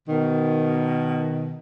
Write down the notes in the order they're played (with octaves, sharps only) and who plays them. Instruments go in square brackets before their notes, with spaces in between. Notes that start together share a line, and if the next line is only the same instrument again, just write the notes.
[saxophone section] B2 D#3